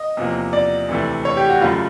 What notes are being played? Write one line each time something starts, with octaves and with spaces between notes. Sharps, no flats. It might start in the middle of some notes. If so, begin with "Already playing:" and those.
Already playing: D#5
E2 C3 F3 A#3
D5
D2 C3 E3 A3
C#5
G4
F#4
F#1 F#2 C#3 F#3 A3 F4